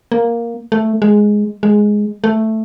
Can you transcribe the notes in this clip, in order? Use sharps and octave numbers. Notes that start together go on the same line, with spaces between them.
A#3
A3
G#3
G#3
A3